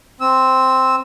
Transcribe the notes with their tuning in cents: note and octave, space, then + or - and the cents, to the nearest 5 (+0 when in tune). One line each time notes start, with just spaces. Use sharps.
C4 +0 E6 -15